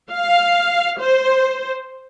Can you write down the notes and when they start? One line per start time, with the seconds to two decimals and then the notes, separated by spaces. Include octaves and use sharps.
0.12 F5
1.01 C5